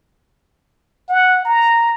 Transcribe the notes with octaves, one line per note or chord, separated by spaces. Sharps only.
F#5
A#5